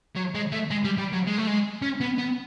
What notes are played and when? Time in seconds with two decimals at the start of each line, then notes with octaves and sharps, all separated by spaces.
0.16 F#3
0.35 G#3
0.52 A3
0.71 G#3
0.84 G3
0.98 G3
1.13 F#3
1.27 G#3
1.38 A3
1.47 G#3
1.82 C#4
2.01 B3
2.18 B3